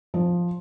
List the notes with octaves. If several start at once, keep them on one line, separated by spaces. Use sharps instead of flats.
F3